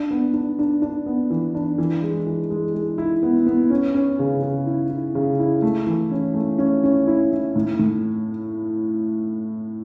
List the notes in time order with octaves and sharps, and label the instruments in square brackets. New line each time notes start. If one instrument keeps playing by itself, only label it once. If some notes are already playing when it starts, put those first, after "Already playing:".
Already playing: [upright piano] D4
B3
D4
D4
D4
B3
E3
D4
E3
G#3
E3
G#3
G#3
E4
B3
B3
C#4
C#4
C#3
C#3
E4
E4
C#3
E4
A3
E3
C#4
A3
C#4
C#4
E4
E4
A2
A2